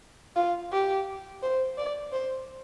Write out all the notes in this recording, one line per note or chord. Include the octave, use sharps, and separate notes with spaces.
F4
G4
C5
D5
C5